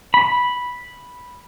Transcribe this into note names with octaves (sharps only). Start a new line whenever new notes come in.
B5